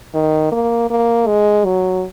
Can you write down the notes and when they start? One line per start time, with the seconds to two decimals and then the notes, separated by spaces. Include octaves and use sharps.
0.14 D#3
0.52 A#3
0.90 A#3
1.27 G#3
1.65 F#3